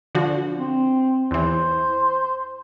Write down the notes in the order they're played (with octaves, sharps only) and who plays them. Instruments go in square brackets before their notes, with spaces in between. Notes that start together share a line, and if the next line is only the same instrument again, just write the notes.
[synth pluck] D3 F3 F#4
[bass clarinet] C4
[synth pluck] E2 E3 [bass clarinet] C5